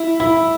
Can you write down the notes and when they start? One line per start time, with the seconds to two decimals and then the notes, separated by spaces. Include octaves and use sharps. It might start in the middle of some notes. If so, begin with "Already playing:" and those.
Already playing: E4
0.20 E4